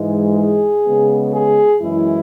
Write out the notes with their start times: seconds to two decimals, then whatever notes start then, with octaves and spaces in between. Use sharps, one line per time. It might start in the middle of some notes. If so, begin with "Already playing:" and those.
Already playing: G#2 E3 G#3
0.35 G#4
0.85 C#3 G#3 B3
1.33 G#4
1.80 F#2 E3 G#3 E4